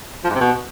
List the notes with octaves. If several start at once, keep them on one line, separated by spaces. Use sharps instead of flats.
F3
G#2
C3
B2